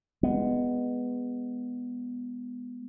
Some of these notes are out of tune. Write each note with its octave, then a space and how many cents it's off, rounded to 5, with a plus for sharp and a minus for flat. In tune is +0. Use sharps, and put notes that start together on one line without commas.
G#3 -15 B3 +0